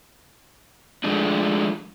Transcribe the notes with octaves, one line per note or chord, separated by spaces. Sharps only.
F3 G#3 A3 D4